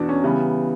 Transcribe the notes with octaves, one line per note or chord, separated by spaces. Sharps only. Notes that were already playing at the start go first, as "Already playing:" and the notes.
Already playing: E2 B2 D4 F#4
C#4
C#3 E3 G3 B3